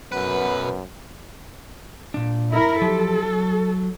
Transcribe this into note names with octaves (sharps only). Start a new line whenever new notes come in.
B1 F#2 B3 B4
A#2 D4
E4 A#4
F3 F#3 G4 A4
F#3